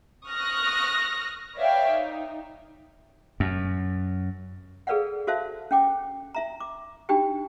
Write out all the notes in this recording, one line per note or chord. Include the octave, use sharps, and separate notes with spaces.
C#6 D#6 F6 F#6 A#6
B4 C#5 D5 E5 F5 G5
D#4
F#2
G#4 A4 B4 D5 F5 F#5
F#4 A4 C5 E5 F5 A5
C#4 F#5 G5 D6
E4 E5 A#5
D6
D4 D#4 F#4 G4 G5